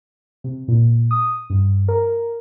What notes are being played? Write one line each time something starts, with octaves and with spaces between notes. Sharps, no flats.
C3
A#2
D#6
G2
A#4